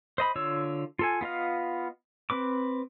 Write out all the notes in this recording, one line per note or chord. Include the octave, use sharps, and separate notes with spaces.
C5 D#5 B5
D3 F4 C#5 E6
F4 A4 G#5
B3 F4 D#5 F5
C4 B4 D6